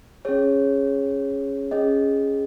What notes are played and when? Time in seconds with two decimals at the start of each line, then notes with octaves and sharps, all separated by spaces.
0.25 C#4 G#4 C#5
1.71 C#4 G#4 D#5